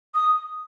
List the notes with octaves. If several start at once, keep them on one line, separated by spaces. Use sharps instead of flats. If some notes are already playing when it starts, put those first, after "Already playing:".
D#6